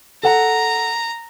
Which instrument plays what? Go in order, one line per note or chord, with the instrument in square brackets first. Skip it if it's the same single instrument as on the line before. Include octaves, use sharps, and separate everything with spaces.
[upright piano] A4 F#5 [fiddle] A#5